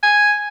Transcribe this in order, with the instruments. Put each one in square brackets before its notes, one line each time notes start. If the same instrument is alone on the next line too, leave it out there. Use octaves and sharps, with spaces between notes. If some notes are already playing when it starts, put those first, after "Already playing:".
[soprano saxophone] G#5